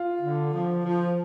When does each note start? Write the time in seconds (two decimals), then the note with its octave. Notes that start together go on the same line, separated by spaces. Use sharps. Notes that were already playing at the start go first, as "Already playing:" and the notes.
Already playing: F4
0.21 D3
0.53 F3
0.84 F3